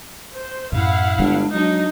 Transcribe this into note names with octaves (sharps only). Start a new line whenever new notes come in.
C5
F#2 A2 E4 F5 F#5
G1 G#3 D4
F#3 D4 D#4